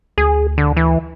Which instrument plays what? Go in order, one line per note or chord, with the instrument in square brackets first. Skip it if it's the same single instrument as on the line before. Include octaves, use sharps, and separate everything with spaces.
[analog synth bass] D2 [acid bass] G#4
[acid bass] D3
E3